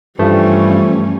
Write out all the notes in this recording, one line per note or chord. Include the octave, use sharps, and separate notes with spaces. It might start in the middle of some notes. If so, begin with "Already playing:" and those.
G2 E3 F3 G3 A3 C#4